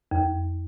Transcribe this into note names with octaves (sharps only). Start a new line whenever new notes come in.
F2